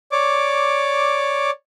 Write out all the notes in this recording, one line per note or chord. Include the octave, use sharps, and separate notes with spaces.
C#5 D5 D6